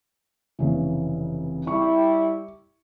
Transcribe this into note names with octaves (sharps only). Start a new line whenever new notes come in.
F1 C#3 E3
G3 E4 C#6